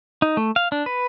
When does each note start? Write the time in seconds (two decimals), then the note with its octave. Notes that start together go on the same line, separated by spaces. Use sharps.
0.22 D#4
0.37 A3
0.56 F5
0.72 D4
0.86 B4